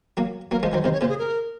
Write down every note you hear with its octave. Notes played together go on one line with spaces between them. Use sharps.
F#3 A#3
F#3 A#3 A#4
F3 G#3 C5
D#3 F#3 C5
C3 D#3 C5
C#5
A#2 C#3 C5
G#4
A#4